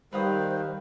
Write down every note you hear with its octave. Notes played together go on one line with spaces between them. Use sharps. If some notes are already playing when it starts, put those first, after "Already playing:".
D#3 G3 B4 C5 F5 D#6